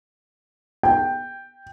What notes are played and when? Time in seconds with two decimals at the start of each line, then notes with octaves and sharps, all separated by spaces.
0.83 G5